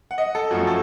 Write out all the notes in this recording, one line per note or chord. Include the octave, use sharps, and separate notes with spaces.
F#5
D#5
A4
F#2 F3 A3 C#4 F#4
A4